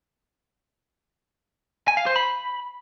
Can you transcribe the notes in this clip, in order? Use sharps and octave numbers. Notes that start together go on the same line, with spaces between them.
G#5
F5
C5
B5